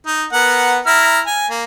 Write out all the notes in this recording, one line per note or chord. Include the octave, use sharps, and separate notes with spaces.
D#4
B3 A#4 F#5
E4 A#5 F6
G#5
A#3